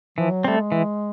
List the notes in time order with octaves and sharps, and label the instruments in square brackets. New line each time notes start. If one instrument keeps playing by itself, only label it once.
[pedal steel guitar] E3 [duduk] F3
[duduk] F#3
[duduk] G3 [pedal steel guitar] A3 C4
[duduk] G#3
[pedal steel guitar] E3